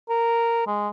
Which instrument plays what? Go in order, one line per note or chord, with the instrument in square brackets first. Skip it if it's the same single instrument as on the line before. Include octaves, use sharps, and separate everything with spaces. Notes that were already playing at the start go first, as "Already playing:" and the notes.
[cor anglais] A#4
G#3